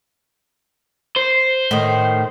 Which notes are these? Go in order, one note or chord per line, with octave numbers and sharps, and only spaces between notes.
C5
A2 D#3